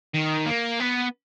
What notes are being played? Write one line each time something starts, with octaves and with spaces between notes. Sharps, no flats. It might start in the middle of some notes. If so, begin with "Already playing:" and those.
D#3
A#3
B3